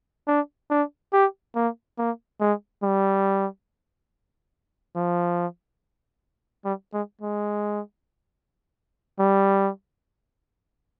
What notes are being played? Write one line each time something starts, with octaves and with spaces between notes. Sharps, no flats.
D4
D4
G4
A#3
A#3
G#3
G3
F3
G3
G#3
G#3
G3